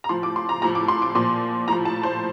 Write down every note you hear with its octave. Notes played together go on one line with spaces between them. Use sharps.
A#5
A2 F3 C6
D6
C6
A#5
A2 F3 A#5
D6
C6
D6
A#2 F3 C6
A2 F3 A#5
A5
C5